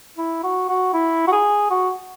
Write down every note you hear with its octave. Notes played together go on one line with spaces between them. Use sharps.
E4
F#4
F#4
E4
F#4
G#4
F#4